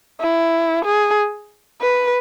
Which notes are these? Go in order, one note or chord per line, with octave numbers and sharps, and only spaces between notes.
E4
G#4
B4